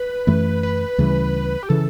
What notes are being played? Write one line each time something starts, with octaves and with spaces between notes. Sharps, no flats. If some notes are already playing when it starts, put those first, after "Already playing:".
Already playing: B4
F#2 E3 A3
B4
D2 C#3 E3 G3
G4
C#3 E3 A4